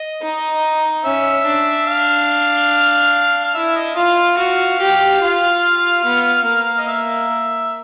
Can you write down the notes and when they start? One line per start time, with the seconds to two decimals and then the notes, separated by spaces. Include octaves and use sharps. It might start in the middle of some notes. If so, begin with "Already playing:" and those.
Already playing: D#5
0.22 D#4
1.04 C#4 E5
1.47 D4
1.87 F5
3.44 F5
3.54 E4 E5
3.76 D#5
3.96 F4 F5
4.16 F5
4.37 F#4 F5
4.80 G4
5.22 F4
6.04 B3
6.45 A#3
6.78 D#5
6.88 E5